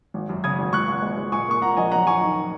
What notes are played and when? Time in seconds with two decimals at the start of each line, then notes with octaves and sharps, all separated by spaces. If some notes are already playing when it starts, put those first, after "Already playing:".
0.14 G#1
0.29 F#2
0.44 C#3 D#6 G#6
0.58 G#1
0.73 C#2 C#6 F#6
0.89 C#2
1.02 G#3
1.17 G#3
1.32 A#2 G#5 C#6
1.48 A#3 C#6
1.62 A#2 F#5 A#5
1.77 A#1 D#5 G#5
1.91 F#1 F#5 A#5
2.07 F#2 G#5 C#6
2.21 D#3